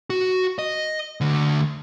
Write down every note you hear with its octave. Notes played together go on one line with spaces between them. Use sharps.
F#4
D#5
D2 D3